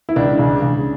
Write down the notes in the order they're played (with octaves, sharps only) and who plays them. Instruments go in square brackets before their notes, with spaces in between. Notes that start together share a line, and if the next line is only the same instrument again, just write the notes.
[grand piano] E4
C#2 D4
C#3
C#3